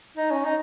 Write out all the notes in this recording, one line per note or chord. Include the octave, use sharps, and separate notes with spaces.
D#4
C#4
D#4